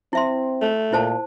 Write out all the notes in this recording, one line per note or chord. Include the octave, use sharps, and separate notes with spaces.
C4 E4 E5 C6
A3
A#2 E4 C5 A5